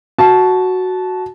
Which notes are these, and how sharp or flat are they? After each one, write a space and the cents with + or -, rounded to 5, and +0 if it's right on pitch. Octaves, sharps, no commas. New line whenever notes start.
F#4 +0 A5 -15